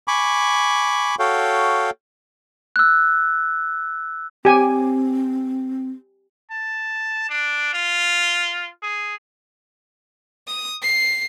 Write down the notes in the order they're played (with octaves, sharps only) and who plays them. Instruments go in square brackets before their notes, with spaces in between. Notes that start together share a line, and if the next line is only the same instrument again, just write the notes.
[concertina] G#5 B5 C#6 D6
F#4 A4 C#5 F5 G5
[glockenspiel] E6 F#6
[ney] C4 [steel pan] G4 G#5
[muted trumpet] A5
D4
F4
G#4
[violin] D#6
C7